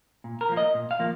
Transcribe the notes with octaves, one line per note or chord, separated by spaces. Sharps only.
A#2
A#4
F3 A#3
D#5
A#2
F5
F3 A#3